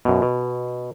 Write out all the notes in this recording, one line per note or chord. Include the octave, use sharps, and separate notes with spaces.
F#2 B2
B2